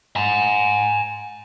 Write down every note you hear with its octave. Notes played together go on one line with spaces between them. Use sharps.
G#5 A#5